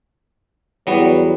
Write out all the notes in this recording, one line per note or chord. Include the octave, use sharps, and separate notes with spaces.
E2 F#3 G3 B3